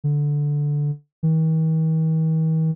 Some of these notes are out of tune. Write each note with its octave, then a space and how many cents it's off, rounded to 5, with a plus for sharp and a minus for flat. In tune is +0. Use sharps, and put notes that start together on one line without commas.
D3 -5
D#3 +45